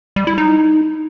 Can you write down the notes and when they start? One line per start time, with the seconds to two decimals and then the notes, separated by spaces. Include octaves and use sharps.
0.16 G3
0.27 E4
0.38 D#4